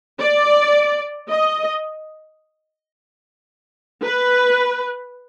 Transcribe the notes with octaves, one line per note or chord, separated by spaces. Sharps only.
D5
D#5
B4